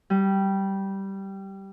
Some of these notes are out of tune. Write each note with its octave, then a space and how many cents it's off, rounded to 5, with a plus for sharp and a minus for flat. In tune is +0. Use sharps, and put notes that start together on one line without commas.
G3 -10